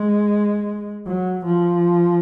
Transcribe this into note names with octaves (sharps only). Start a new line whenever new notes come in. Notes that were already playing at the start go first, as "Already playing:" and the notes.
Already playing: G#3
F#3
F3